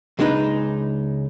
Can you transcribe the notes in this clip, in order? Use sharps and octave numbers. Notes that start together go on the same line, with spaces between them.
C#2 G#3 D4 D#4 B4